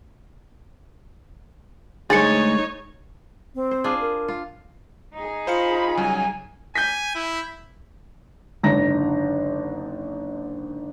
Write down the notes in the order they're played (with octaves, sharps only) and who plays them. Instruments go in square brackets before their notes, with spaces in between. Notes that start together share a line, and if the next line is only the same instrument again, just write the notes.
[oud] D2 G#3 A3 [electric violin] D#4 C#5 [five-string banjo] G#4 [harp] A6 C#7
[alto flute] C4
[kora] C5
D4 F4 G#4
[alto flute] A#4
[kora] F4
[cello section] D#4 G#4
[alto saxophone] F4 [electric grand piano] C5 F5 C#7 [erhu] B5
[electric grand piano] C#3 F#3 G3 [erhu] G#5
[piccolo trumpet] G#5 [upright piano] G6 B6
[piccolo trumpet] E4
[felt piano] F#1 G#2 D3 D4 A#5 A#6